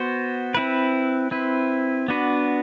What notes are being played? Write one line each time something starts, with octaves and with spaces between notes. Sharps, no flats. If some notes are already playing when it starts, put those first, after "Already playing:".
Already playing: B3 F#4 C5
C4 E4 B4
C4 E4 B4
B3 D4 F#4 B4